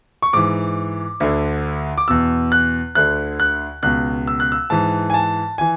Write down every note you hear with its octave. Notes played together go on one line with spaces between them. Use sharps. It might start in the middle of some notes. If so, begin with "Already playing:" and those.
C#6
G#2 E3 D6
D2 D3
D6
E2 B2 E6
F#6
D2 D3 F#6
F#6
C#2 B2 F#6
E6
F#6
E6
G#2 E3 A5
G#5
A5
E3 G#5